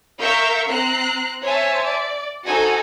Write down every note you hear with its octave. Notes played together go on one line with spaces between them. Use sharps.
A#4 E5 F5 C#6 G6
C4 A#5 F#6 C7
C5 C#5 E5 G#5 A5
D5
D#4 F#4 A4 C5 F#5 G#5